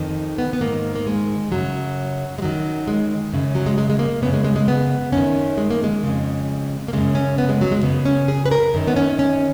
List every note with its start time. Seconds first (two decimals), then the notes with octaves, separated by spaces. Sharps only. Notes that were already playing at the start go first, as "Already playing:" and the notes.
Already playing: F2 D#3
0.38 B3
0.53 B3
0.61 G#2 D#3 A#3
0.95 A#3
1.07 G#3
1.52 F#2 C#3 F#3
2.38 G#3
2.42 F#2 D#3 F#3
2.88 G#3
3.33 F#2 C#3
3.55 F#3
3.66 G#3
3.78 G#3
3.90 G#3
3.99 A#3
4.22 F#2 C#3 B3
4.33 G#3
4.45 G#3
4.56 G#3
4.68 B3
5.12 F#2 D#3 C#4
5.58 G#3
5.71 A#3
5.84 G#3
6.03 F2 C#3
6.88 A#3
6.93 F#2 C#3 G#3
7.15 C#4
7.38 B3
7.49 G#3
7.61 F#3
7.71 G#3
7.83 F#2 C#3 B3
8.05 C#4
8.28 G#4
8.45 B4
8.51 A#4
8.74 F#2 D#3
8.88 B3
8.96 C#4
9.19 C#4